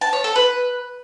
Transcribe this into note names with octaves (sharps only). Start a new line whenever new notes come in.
A5
C#5
A4
B4